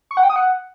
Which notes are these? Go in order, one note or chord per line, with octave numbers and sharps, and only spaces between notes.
C#6
F#5
G5
D#6
F#5